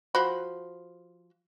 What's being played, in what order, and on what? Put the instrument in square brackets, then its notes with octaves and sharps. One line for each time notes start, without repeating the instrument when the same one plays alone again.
[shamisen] F3 F#4 B5